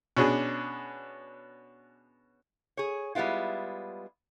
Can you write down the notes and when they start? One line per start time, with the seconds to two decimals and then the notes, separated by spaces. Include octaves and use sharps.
0.17 B2 C#4 D4 G#4
2.77 G#4 C#5
3.15 G3 G#3 B3 E4 F4